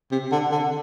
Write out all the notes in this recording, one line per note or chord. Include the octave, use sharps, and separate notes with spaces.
C3
D3
D3